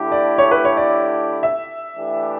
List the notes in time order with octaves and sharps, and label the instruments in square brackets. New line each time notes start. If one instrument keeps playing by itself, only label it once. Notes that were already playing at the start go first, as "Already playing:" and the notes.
Already playing: [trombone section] D3 A3 E4 G4
[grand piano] D5
C#5
B4
C#5
D5
E5
[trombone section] E3 A3 D4 G4